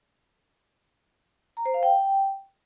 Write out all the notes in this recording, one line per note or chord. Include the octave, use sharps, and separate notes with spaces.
A#5
C5
F5
G5